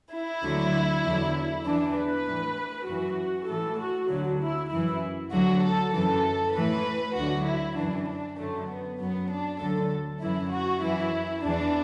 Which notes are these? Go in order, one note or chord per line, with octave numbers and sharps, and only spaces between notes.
E4
D2 D3 F#3
E2 D3 F#3
E2 E3 D4
B4
A2 E3
F#2 E3 F#4
A2 E3 A4
F#4
D2 D3 F#3
E4
F#2 E3 E4
D2 D3 F#3 F#4
A4
F#2 E3 A4
A2 E3 B4
D2 D3 F#3 F#4
E4
F#2 E3 D4
D4
F#2 D3 F#3 A3
B3
F#2 F#3 B3
D4
D2 D3 F#3 A4
F#2 E3 E4
F#4
F#2 E3 E4
E2 E3 D4